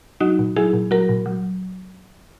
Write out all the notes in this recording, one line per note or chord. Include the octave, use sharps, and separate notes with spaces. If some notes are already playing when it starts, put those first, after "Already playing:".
F#3 D#4 F#4
A#2
F#3 E4 G#4
A#2
F#3 F#4 A#4
A#2
F#3